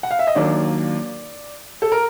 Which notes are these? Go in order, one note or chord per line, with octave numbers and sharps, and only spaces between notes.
F#5
F5
E5
D#5
D#2 D#3 F#3 A#3 D4 D5
A4
A#4